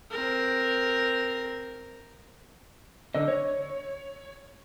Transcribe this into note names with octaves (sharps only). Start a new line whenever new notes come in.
C4 A#4
D3 D#5
C#5